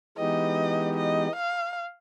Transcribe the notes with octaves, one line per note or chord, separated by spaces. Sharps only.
E3 G#3 B3 D#4 G4 D#5
D#5
F5